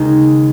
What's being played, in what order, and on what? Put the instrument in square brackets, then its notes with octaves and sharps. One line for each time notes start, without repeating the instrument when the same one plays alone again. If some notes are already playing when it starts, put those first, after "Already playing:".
Already playing: [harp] D#2 C#3 G#3 D#4